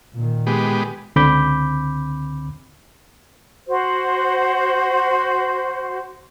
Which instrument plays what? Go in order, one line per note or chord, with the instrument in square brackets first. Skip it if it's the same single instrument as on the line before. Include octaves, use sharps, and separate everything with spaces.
[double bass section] A#2 D#3
[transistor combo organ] G#3 B3 G4
[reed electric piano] C#2 D3 C4 B5 D6 G6
[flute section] F#4 C5